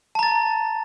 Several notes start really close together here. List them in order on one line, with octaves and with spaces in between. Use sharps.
A5 A#5 A6